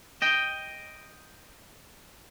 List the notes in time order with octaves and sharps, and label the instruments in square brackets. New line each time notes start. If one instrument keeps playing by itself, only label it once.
[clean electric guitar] D#5 G5